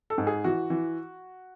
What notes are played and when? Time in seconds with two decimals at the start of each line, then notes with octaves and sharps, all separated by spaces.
0.10 A4
0.18 G#2
0.27 G#4
0.44 E3 F#4
0.70 E3